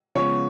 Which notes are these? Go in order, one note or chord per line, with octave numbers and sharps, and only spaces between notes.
C#3 F3 G#3 B3 C#5